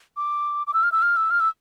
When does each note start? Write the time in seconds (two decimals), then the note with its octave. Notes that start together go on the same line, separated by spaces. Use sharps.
0.17 D6
0.67 D6
0.74 E6
0.83 F6
0.92 E6
1.02 F6
1.17 E6
1.31 F6
1.40 E6